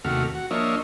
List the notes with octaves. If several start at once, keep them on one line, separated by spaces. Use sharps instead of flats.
D#2 C3 A3 F#4 F6
F#4
F3 A#3 D4 C#5 D#5 E5